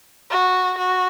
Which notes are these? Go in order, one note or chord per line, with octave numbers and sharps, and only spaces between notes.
F#4
F#4